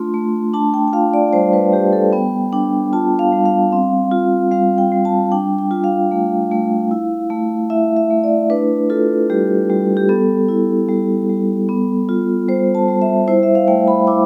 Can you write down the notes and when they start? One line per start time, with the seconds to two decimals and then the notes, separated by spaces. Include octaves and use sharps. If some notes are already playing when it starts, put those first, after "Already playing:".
Already playing: A3 D4 F4 C6
0.14 A3
0.54 D4 A5
0.74 G5
0.88 G5
0.93 F4 F5
1.14 D5
1.33 G3 C5
1.53 B4
1.72 G3 G4
1.93 A4
2.13 B3 G5
2.52 D4 G5
2.93 F4 A5
3.19 F5
3.32 G3
3.45 F5
3.72 C4
4.11 F4
4.51 G3 F5
4.78 G5
4.92 G3
5.05 A5
5.32 D4 G5
5.59 G5
5.71 F4
5.84 F5
6.11 A3
6.51 A3
6.91 E4
7.30 A3
7.70 E4 E5
7.97 E5
8.11 A3
8.24 D5
8.50 D4 B4
8.90 F4 A4
9.30 G3 G4
9.69 G3
9.97 G4
10.09 B3 A4
10.49 E4
10.89 G3
11.29 G3
11.69 B3
12.09 F4
12.48 G3 C5
12.75 A5
12.88 G3
13.02 E5
13.28 E4 C5
13.43 E5
13.55 F5
13.68 A3 G5
13.88 B5
14.07 E4 D6